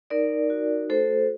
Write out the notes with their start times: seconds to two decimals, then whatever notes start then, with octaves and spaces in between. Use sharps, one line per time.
0.10 D#4 A#4 D5
0.50 F#4
0.90 A3 A4 C5